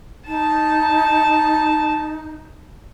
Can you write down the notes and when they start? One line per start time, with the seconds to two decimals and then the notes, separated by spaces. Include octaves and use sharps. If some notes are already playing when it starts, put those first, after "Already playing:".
0.27 D#4 A5